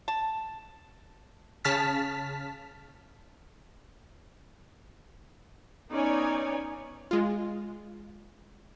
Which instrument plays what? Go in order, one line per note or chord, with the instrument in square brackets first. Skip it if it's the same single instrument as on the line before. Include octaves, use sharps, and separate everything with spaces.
[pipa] A5
[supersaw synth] C#3 A5 F6 B6
[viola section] B3 C#4 D#4 C#5 D5 G#5
[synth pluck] G#3 F4